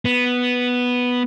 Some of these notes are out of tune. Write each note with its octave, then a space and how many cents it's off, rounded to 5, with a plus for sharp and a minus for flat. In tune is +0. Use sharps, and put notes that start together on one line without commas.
B3 +0